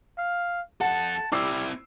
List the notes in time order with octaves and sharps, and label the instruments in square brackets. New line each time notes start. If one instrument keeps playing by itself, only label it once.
[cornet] F5
[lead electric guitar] F2 A4 [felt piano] F#5 [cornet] A5
[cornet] G3 [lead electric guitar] C4 E4 [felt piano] D6 E6 C7